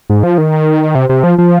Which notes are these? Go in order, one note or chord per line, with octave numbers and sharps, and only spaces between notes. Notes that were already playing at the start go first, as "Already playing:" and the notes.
G#2
F3
D#3
C3
C3
F3
F3